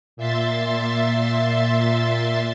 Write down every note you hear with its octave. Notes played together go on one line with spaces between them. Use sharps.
A#2 E5 C6 A6